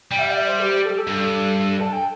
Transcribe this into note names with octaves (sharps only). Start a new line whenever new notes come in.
G3 G5
E5
G5
D5
E5
C5
G4
A4
G4
A4
G2
A5
G5